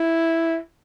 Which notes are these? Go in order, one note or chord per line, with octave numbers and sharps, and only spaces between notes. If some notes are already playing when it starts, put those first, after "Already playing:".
Already playing: E4